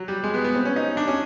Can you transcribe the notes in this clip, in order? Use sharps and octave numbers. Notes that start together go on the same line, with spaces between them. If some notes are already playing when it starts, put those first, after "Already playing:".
Already playing: F#3
G3
G#3
B3
B3
C4
C#4
D#4
D4
C#4